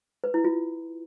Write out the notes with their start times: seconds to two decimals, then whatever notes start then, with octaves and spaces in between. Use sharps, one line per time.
0.24 B4
0.34 E4
0.44 F4